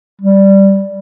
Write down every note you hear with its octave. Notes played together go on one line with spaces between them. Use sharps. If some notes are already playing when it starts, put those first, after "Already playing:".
G3